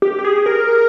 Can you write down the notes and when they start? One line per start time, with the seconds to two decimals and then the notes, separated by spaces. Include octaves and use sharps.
0.02 G4
0.19 G4
0.24 G#4
0.46 A#4